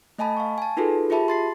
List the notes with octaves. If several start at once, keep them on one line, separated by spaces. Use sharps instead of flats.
A3 D#5 G#5 A5 B5
F5 C#6
G#5 A5
D#4 F4 F#4 G#4 A4 B4
F4 G4 G#4 E5 A5 B5
C6 A6 C7